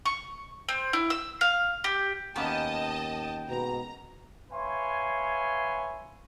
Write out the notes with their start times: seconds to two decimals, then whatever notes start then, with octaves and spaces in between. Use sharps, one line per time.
0.06 C#6
0.69 C4
0.93 E4
1.10 E6
1.41 F5
1.84 G4
2.36 D#2 A#3 B3 C#4 D#5 G5 A5
3.49 G#2 B2 A#5
4.51 B4 C#5 E5 F5 G#5 C6